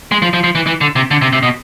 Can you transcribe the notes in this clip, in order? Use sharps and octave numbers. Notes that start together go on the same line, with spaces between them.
G#3
F3
F3
F3
E3
E3
D3
C3
D3
C3
C3
B2